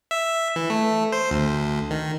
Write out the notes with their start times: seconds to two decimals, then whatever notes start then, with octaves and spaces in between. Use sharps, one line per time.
0.11 E5
0.56 E3
0.70 A3
1.12 C5
1.31 D2
1.91 D#3